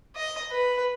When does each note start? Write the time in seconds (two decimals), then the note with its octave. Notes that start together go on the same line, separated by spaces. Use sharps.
0.16 D#5
0.52 B4